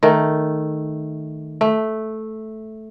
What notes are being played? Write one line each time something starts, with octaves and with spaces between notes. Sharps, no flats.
D#3 A3
A3